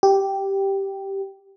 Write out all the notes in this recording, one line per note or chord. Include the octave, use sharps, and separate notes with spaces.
G4